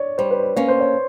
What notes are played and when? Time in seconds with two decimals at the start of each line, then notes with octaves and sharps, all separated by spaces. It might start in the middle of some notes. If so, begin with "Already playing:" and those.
Already playing: C#5 D5
0.18 G3 C5
0.31 B4
0.43 C5
0.56 A#3 C#4 C#5
0.68 C5
0.80 C#5